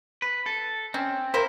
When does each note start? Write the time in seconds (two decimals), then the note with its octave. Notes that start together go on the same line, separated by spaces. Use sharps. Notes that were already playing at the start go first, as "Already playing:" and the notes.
0.22 B4
0.46 A4
0.94 C4 C#4
1.34 A#3 E4 A#4 C5